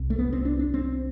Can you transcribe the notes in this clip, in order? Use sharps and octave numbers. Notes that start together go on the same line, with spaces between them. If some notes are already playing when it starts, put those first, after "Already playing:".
Already playing: C2 C3
A3
B3
C4
D4
D4
C4